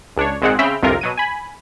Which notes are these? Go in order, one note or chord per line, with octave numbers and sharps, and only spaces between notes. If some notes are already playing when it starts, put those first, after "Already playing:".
C#2 D4 C#5
G#1 A#2 G#3 C4 G#4 F#5
C#3 C4 E5 G5 B5 F6
G1 C2 F2 C3 F4 A#4
B2 F#3 D#7
G#5 B5